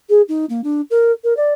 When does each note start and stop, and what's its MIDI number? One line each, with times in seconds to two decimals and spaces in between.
0.09 0.22 68
0.29 0.45 63
0.50 0.61 58
0.64 0.81 62
0.91 1.12 70
1.24 1.36 70
1.37 1.54 74